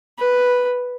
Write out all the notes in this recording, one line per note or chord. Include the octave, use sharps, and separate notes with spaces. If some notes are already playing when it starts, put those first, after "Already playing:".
B4